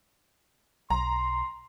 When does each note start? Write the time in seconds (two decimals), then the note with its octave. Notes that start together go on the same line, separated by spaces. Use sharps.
0.90 B1 A#5 C6